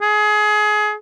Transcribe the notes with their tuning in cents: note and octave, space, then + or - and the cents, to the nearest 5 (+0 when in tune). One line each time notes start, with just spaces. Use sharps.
G#4 +25